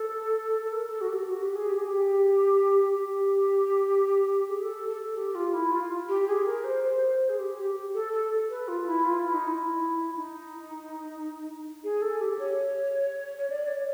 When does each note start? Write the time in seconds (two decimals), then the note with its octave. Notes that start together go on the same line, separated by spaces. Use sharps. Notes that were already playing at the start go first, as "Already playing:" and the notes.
Already playing: A4
0.67 A4
0.72 A#4
0.90 A4
1.01 F#4
1.09 G4
1.27 F#4
1.42 G4
1.55 G#4
1.69 G4
1.78 G#4
1.87 G4
2.94 G4
4.49 G#4
4.62 A4
4.89 A4
5.17 G4
5.35 F4
5.54 E4
5.72 F4
6.09 G4
6.27 G#4
6.46 A#4
6.64 C5
6.84 C5
7.29 G#4
7.39 G4
7.58 G4
7.94 A4
8.13 A4
8.50 B4
8.68 F4
8.87 E4
9.05 F4
9.19 E4
9.34 D#4
9.48 E4
10.16 D#4
11.84 G#4
12.02 A4
12.21 G4
12.39 C#5
13.38 C#5
13.50 D5
13.68 C#5